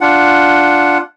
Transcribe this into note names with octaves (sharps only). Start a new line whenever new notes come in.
D4 F4 F#5